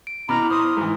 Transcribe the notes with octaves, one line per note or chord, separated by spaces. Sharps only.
D7
B2 E4 A#5 B5 D6 F6
C5 C6 D#6 F6
G#2 E3